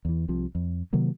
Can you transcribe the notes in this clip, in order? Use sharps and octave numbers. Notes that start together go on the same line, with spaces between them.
E2 E3
C2 C3 F3
F2
C3 D#3 F#3 A#3